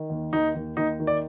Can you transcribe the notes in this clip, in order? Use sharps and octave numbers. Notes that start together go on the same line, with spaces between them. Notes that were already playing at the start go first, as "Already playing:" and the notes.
Already playing: D#3
D#2
D#2 D#4
D#2
D#2 D#4
D#3
D5